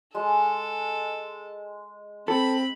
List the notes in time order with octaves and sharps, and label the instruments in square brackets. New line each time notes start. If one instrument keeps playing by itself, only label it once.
[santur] G#3 [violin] A4
[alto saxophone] C4 [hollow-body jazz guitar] A4 [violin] B5